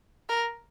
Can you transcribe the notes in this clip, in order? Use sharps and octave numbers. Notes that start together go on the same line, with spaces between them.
A#4